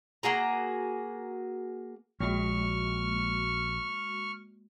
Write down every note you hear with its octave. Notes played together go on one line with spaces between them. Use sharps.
A#3 F#4 G#4 A#5
A#1 G#3 A#3 F#4 C#6 F6